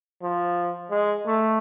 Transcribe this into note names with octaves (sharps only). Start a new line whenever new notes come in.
F3
G#3
A3